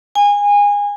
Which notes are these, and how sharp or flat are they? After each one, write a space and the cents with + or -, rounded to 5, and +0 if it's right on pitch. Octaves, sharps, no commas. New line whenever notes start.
G#5 -25